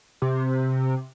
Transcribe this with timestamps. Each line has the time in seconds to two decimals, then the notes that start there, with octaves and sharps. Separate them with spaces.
0.22 C3